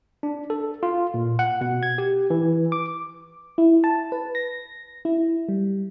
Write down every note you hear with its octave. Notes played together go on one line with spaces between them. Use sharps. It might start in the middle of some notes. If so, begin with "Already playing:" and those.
D4
A4
F4
A#2
F#5
B2
G#6
G4
E3
D6
E4
A5
B4
A#6
E4
G3